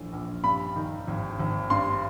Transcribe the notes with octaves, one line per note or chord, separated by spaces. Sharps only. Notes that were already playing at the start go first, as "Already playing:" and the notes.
Already playing: A#1 A2 E3
A#1
G2 B5
D#3
G#1
G#1
G2 C6